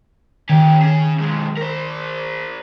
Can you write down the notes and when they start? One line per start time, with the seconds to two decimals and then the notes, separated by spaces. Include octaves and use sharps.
0.49 D#3 C#4 G4
0.82 C#4 G#4
1.18 B1 G#3
1.57 A#4 C5